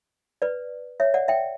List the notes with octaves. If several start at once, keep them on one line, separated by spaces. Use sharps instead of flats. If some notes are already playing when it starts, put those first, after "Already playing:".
B4 D5
C#5 E5
D5 F#5
E5 G5